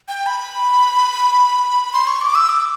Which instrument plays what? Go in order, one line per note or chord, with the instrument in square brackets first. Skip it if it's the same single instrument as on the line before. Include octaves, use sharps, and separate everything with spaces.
[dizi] G5
B5
C6
C#6
D6
E6
D6